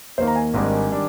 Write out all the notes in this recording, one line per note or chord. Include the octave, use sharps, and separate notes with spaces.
D#2 D#3 A#3 C5
A#5
G#5
G#1 G#2 D#3 G3 D4
D#3 G3 D4